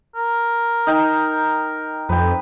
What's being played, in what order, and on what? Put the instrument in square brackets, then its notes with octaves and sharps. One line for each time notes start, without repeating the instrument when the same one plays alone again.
[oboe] A#4
[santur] D#4 G5
[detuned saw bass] F2 [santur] B4 G5